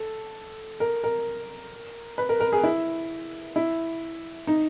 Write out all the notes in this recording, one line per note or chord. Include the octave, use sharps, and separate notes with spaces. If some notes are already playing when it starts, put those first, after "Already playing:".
Already playing: A4
A#4
A#4
B4
A#4
A#4
G#4
E4
E4
D#4